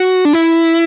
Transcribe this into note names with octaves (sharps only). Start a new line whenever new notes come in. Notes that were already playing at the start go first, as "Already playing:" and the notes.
Already playing: F#4
D4
E4